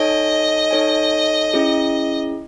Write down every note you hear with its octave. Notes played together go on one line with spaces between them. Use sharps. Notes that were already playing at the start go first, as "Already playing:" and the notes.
Already playing: D#4 A4 C#5 D#5 G#5
D#4 A4 C#5 G#5
C#4 E4 G#4